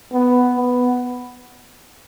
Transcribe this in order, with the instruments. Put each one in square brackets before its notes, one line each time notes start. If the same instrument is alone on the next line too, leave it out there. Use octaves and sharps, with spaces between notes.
[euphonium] B3
B3